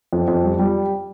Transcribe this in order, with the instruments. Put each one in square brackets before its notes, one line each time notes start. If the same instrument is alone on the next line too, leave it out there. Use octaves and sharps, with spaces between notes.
[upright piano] F2
F2
G3
G3